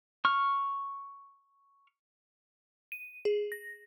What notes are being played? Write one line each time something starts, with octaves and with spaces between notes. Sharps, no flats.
C#6 F6
D#7
G#4
A#6